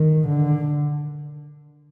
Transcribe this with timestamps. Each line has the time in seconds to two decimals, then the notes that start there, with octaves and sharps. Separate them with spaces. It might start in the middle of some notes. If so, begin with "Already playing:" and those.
Already playing: D#3
0.27 D3